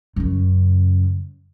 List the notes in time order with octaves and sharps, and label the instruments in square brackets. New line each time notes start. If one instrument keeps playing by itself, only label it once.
[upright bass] F#2 C#3